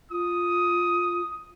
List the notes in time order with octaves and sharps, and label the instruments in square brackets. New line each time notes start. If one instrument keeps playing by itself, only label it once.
[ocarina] F4 [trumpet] D#6